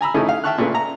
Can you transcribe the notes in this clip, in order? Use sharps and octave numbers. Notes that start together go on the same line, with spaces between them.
G#5 A#5 B5 E6
C#3 F3 A3 C#4 D#4 E4
F5
E5 G5 A5 C#6 F6 F#6
A#2 C#3 A3 B4
A#5